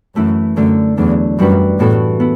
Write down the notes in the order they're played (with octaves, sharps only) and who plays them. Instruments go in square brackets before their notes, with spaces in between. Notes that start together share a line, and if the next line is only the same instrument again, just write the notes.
[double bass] F#2 [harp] E3 A3 E4
[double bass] F#2 [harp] D3 A3 D4
[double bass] E2 [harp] F#3 A3 D4
[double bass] F#2 [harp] E3 G3 D4 F#4 B4
[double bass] A2 [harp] E3 B3 F#4 A4
[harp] B3 E4